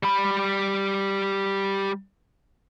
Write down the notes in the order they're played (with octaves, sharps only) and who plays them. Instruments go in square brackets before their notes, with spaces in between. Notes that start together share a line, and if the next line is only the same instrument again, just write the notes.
[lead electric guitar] G3 B5